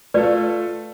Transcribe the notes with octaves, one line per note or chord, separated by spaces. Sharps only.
A3 F4 A4 B4 D5